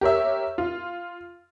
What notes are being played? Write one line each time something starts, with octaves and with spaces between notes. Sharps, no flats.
G4 A#4 C#5 E5
F4